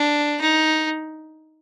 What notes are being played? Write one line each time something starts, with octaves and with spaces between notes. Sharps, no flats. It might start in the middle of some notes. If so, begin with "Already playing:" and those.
Already playing: D4
D#4